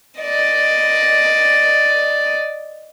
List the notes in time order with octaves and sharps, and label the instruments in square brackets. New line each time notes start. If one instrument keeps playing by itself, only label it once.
[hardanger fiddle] D5 D#5